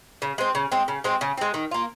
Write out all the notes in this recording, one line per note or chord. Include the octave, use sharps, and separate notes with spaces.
C#3
G#3 C4
C#3
G#3 C4
C#3
G#3 C4
C#3
G#3 C4
D#3
A#3 F4